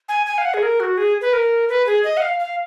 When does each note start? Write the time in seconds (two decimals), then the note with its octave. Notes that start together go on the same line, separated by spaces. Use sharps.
0.09 G#5
0.26 G#5
0.38 F5
0.45 F#5
0.54 G#4
0.63 A#4
0.80 F#4
0.98 G#4
1.21 B4
1.33 A#4
1.69 B4
1.86 G#4
2.04 D#5
2.17 F#5
2.22 F5
2.40 F5